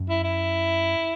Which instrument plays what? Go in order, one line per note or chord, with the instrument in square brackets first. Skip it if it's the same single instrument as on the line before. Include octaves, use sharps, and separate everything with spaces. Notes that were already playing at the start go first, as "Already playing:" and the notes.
Already playing: [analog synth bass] F#2
[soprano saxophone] E4
E4